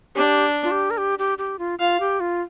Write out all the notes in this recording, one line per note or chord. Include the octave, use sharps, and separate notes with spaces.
D4 G4
F4
G4
A#4
G4
G4
G4
F4
F4 F5
G4
F4